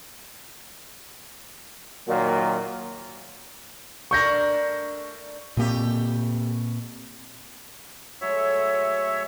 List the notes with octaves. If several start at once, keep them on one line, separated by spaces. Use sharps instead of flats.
A#2 D#3 F#3
A3 D4 A#4 C#6 G6 A#6
A#2 A3 A#3 C4 G4
F#3 G#3 A3 C#5 E5